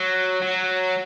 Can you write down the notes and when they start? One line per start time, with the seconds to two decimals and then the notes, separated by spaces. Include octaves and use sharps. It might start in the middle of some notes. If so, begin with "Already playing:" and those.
Already playing: F#3
0.42 F#3